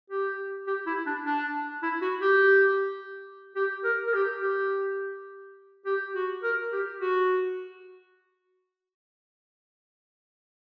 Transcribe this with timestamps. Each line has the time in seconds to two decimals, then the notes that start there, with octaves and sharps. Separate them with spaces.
0.10 G4
0.68 G4
0.87 E4
1.07 D4
1.25 D4
1.83 E4
2.02 F#4
2.22 G4
3.56 G4
3.84 A#4
4.07 A#4
4.14 G4
4.42 G4
5.86 G4
6.15 F#4
6.43 A#4
6.73 G4
7.02 F#4